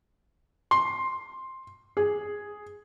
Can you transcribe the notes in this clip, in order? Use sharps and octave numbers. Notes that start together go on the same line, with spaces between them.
C6
G#4